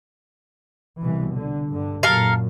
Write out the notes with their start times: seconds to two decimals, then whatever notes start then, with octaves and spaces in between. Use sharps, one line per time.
1.01 C2 B2 E3
1.35 D3
1.69 G2 D3
2.03 F#2 A#2 A4 A#4 F5